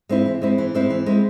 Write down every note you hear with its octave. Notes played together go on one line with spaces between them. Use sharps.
G#3 C4 E4
E3
G#3 C4 E4
E3
G#3 C4 E4
E3
G#3 C4 E4